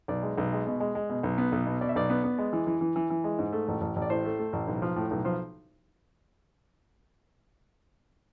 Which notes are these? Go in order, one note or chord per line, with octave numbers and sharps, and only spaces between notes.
B1 D5
G#3
B1
G#3
B2
G#3
G#3
B2
B1
B3
B1
B2
B2 D5
E5
B1 D5
B3
B3
G#3
E3
E3
E3
E3
E3
G#3
G#2
A3
A1
A1
A1
D5
A2 C5
A3
A3
A1
B1
F3
A2
B1
F3 C5